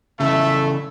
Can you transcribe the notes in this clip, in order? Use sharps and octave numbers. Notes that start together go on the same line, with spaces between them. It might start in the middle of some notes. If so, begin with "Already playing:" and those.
F2 C#3 E3 A3 A4 E5